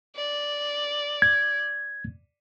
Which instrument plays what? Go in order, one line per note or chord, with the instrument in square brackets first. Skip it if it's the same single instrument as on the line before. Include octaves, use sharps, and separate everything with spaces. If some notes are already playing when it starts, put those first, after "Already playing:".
[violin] D5
[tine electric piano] G#6